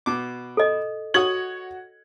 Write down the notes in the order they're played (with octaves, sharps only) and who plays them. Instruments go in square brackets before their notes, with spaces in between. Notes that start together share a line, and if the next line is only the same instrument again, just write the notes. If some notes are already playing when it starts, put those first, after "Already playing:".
[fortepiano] B2 D6
[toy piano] A4 D#5
[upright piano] F#4 G#6 F#7 [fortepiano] C#5 D#6